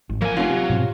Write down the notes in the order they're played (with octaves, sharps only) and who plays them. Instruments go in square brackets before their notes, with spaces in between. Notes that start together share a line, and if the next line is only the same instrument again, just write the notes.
[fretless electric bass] G#1
[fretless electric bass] F3 [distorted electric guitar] F#3 G#5 [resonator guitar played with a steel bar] A#3
[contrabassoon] F1 [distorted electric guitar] F#3 [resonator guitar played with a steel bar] C#4 F4
[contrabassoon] C3
[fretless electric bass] G#2 B2 C4